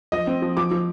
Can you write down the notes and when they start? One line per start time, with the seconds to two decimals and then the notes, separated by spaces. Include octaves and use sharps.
0.12 F3 D#5
0.27 C4
0.42 F3
0.57 F3 D6
0.71 F3